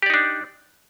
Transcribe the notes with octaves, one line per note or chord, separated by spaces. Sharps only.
D4 D#4 G4 D5